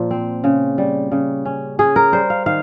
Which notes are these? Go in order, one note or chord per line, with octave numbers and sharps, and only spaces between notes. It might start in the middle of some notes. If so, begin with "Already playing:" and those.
Already playing: A#2 F3
C4
C#3
G3
C#3
C#4
C#4 G#4
A#4
G3 C5
F5
D#3 F5